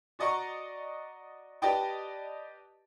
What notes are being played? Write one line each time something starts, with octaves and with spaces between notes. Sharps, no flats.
F#4 D5 D#5 F#5 A#5 C#6
G4 B4 D5 D#5 G5 A5